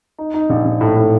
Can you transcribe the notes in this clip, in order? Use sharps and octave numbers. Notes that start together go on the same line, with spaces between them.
D#4
D#4
A#1
A#1
A2
A2